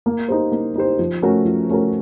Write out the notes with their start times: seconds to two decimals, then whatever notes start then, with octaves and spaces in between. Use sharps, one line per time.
0.06 A#3
0.29 D#4 G4 C5
0.52 A#3
0.76 D#4 G4 C5
0.99 F3
1.22 A3 C#4 F#4 A#4
1.45 F3
1.69 A3 C#4 F#4 A#4